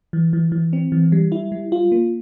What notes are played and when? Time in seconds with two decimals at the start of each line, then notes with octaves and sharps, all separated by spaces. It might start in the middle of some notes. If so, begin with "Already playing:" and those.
0.13 E3
0.33 E3
0.52 E3
0.73 C4
0.92 E3
1.12 G3
1.32 E4
1.52 G3
1.72 F4
1.92 A#3